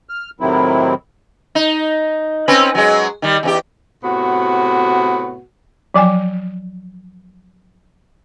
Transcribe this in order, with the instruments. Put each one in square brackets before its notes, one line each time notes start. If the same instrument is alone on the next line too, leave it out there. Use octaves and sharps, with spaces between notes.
[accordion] F6
A2 C3 D#3 F#3 C4 E4
[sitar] D#4
C4 C#4 B4
F#3 G#3
D#3 G3
E2 C#4 G4
[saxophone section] A2 C3 B3 F#4
[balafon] F3 F#3 G5 G#5